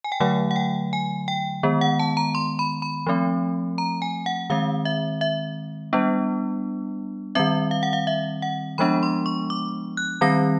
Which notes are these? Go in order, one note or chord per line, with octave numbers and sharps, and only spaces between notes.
G#5
G5
D3 F#3 A3 F#5
F#5
G5
G#5
G5
D#3 G#3 B3
F#5
A5
A#5
C6
B5
B5
F3 A3 C4
A#5
G#5
F#5
D#3 G#3 C4 F5
E5
E5
G3 B3 D4
D#3 G3 C4 E5
F5
F#5
F5
E5
F#5
F3 G#3 B3 D4 B5
C6
C#6
D6
F#6
D#3 G3 C4 A#6